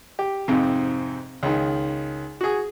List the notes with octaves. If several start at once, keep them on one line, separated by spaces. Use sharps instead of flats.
G4
F2 G#2 C3
C#2 D#3
F#4 G#4